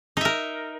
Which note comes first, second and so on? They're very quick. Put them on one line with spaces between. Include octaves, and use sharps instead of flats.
D#4 E5 A#4